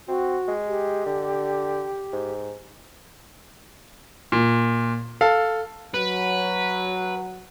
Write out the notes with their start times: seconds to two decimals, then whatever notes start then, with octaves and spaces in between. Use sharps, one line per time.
0.08 C4 F#4
0.48 G#3
0.68 G4
1.06 D3
2.12 G#2
4.32 A#2
5.21 A4 F5
5.94 F#3 B4